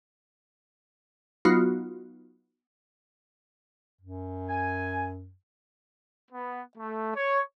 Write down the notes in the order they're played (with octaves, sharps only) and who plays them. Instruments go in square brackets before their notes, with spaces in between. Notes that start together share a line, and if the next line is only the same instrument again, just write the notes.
[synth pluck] F#3 B3 D#4 F4 F#4
[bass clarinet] F#2
[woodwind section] G#5
[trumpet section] B3
A3
C#5